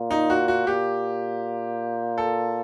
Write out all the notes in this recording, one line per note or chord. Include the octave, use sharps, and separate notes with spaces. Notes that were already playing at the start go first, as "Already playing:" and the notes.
Already playing: A#2
D#4
F#4
F#4
A#2 G4
A4